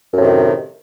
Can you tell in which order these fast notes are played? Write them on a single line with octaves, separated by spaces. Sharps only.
F#2 A2 C3 D#3